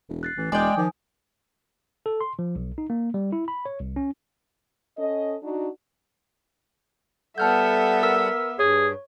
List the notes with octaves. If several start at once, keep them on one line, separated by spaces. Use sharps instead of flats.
E1
F#6 A6 C7
A1 E3
E1 G#3 D5 G5 G#5 D#6
D#3 F3
A4
C6
F3
B1
D#4
A#3
G3
E4
B5
C#5
C2
C#4
C#4 A4 D#5
D4 D#4 F#4
G3 B3 A4 E5 F#5 A5 F6 G6
A#4 E6 B6
G2 G#4 C#5